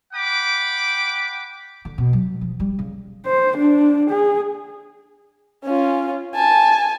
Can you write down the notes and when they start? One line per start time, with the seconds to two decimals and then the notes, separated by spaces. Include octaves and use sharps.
0.13 F#5 G5 B5 D6
1.85 D3
1.98 B2
2.13 F#3
2.41 F3
2.60 G3
2.79 C#3
3.26 C5
3.57 D4
4.10 G#4
5.64 C#4 F4
6.35 G#5 A5